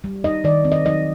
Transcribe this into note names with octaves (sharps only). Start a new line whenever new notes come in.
G3
D#4 D#5
D#3 D5
C4
D#5
F#3 D#5